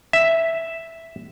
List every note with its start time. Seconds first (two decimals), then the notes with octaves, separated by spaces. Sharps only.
0.13 E5